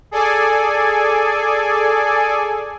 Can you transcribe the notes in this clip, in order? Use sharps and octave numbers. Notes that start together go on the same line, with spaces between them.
G#4 A4 D5 G#5